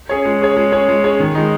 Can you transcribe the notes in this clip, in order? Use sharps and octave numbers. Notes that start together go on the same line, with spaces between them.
C#4 G#4 C#5
G#3
C#4 G#4 C#5
G#3
C#4 G#4 C#5
G#3
C#4 G#4 C#5
D#3
G#3 D#4